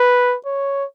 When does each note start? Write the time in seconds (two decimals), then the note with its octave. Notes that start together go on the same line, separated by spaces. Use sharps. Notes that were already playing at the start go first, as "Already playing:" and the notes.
Already playing: B4
0.46 C#5